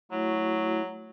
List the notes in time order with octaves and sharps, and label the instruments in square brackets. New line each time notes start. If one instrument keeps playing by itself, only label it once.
[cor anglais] F#3 [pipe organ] A3 E4 F#4